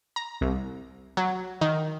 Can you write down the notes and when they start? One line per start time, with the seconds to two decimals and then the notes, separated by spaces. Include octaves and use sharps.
0.16 A#5
0.41 C2
1.17 F#3
1.61 D#3